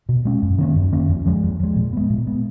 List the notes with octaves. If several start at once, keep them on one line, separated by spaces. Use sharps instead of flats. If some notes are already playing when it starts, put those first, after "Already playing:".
B2
G#3 C#4
F#2
D#3 A#3 C#4
F#2
D#3 A#3 C#4
F2
F3 G#3
F2
F3 G#3
A#2
G#3 B3
A#2
G#3 B3